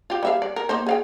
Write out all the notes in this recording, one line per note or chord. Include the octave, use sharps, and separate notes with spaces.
F4 G4
G3 E5 F5
D5
A#4
A#3 D#4 C5
G#4 F5 G5